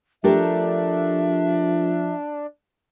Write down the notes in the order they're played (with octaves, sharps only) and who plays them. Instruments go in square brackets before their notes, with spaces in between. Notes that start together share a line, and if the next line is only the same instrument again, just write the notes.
[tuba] F3 [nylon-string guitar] A3 G4 A#4 [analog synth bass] D4 [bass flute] E5